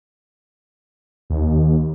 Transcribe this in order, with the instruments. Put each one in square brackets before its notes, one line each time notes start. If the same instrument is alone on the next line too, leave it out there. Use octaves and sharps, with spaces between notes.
[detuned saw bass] D#2